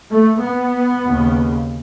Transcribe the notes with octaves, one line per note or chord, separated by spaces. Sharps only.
A3
B3
D#2 C#3